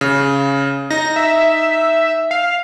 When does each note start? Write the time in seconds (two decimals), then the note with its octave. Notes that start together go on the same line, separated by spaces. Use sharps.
0.01 C#3
0.91 D#4 A#6
1.16 E5
2.31 F5